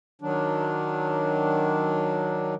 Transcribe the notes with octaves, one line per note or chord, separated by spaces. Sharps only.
D#3 F#3 D4